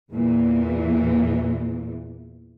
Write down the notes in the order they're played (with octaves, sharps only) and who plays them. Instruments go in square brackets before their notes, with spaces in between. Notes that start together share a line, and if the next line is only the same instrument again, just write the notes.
[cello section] E2 A#2 E3